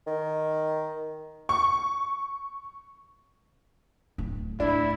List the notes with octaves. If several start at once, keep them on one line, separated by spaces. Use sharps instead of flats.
D#3
C#6
D1
A2 D4 E4